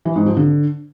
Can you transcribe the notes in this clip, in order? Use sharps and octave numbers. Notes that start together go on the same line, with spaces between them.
E3
G#2
F3
D3